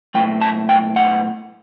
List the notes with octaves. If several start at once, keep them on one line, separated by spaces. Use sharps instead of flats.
B1 A2 F#3 G5
A5
G5
F#5